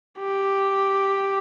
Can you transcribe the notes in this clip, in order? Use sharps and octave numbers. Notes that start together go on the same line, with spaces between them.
G4